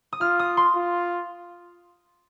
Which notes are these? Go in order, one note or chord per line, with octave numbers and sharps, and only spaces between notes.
D#6
F4 F6
D#6
C6
F4